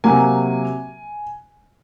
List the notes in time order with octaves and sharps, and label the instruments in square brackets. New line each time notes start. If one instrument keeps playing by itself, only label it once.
[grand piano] C3 F#3 A#3 G#5